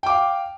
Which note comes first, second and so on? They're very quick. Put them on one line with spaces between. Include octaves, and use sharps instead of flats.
G5 D6 F5